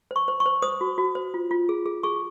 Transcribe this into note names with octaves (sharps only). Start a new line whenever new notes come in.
C5 C#6
C5
C#6
C5
C5 D#6
F#4
F#4
C5
F4
F4
G#4
G#4
G#4 C#6